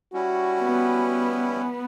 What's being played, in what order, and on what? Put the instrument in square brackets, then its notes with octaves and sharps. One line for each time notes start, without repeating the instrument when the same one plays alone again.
[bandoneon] G3 C#4 E4 [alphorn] F#4
[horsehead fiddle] B3